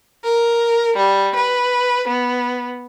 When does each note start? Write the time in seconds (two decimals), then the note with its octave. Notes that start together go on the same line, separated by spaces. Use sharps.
0.23 A#4
0.96 G3
1.36 B4
2.07 B3